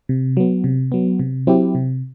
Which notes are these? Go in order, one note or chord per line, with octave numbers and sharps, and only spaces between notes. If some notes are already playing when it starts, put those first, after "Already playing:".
C3
F#3 B3
C3
F#3 B3
C3
F#3 C4 E4 G4
C3